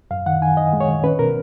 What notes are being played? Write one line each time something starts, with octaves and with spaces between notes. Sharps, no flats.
F#2 F5
D#3 F#5
D#3 G#5
D#3 D#5
G#3
C#5
D#3
C#4 B4
B2 A#4